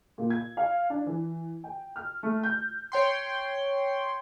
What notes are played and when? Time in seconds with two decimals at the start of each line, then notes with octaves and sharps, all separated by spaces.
0.18 A#2
0.30 G#6
0.57 F5
0.90 D4
1.06 E3
1.64 G5
1.96 F6
2.23 A3
2.44 G6
2.92 C#5 G5 C6